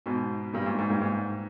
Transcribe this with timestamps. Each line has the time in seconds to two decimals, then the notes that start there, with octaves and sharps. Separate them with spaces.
0.06 G#2 B2
0.53 G2 A#2
0.66 G#2
0.79 G#2
0.90 G2 A#2
1.02 G#2